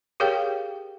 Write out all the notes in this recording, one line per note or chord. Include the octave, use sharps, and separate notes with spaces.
G4 G#4 A#4 C#5 F5 G5